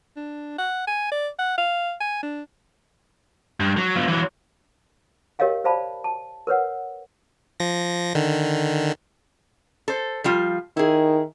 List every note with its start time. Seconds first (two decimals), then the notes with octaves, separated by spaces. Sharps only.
0.17 D4
0.58 F#5
0.87 G#5
1.12 D5
1.39 F#5
1.58 F5
2.00 G#5
2.23 D4
3.60 G2
3.77 F#3
3.96 B3 F4
4.08 E3 F#3
5.39 G4 A#4 C#5 D#5 F5 G5
5.64 C5 D5 F5 A5 B5
6.04 A5
6.47 A#4 B4 C#5 F#5
7.60 F3 A#6
8.15 D3 D#3
9.88 A4 C5
10.24 F3 G3 F4
10.77 D#3 E4 G#4